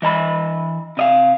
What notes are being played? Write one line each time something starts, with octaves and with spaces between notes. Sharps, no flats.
E3 D#5 A#5 B5
C3 D#5 F5